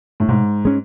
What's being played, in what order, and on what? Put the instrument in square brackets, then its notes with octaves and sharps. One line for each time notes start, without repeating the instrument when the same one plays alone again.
[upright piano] A2
[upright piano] G#2 [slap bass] B2
[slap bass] G#3 C#4